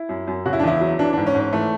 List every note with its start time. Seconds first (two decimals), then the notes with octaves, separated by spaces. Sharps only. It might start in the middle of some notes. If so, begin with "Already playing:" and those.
Already playing: E4
0.09 F#2
0.27 F#2
0.46 C#3 F#4
0.53 E4
0.59 D4
0.63 E2 E4
0.81 F#3
0.99 E3 D4
1.13 D4
1.17 G#2
1.26 C#4
1.35 G#2
1.40 C#4
1.53 E3 A3